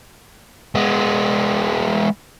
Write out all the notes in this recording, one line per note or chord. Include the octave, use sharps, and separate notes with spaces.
G#3 B3